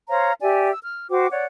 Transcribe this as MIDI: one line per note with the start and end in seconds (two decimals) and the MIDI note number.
0.09 0.32 72
0.09 0.32 73
0.09 0.32 77
0.09 0.32 82
0.42 0.70 67
0.42 0.70 74
0.42 0.70 76
0.42 0.70 80
0.71 0.79 88
0.84 1.09 89
1.10 1.27 66
1.10 1.27 72
1.10 1.27 79
1.10 1.27 86
1.32 1.45 73
1.32 1.45 74
1.32 1.45 78